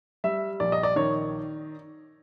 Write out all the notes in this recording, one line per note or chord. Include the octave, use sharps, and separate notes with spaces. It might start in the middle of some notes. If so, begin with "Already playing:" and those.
G3 E5
A#1 D5
D#5
D5
D#3 C#5